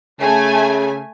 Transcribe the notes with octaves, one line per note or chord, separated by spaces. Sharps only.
C#3 A3 G#5